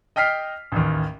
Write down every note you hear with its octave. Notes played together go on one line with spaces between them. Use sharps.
D#5 G5 F6 B6 C7
A1 D#2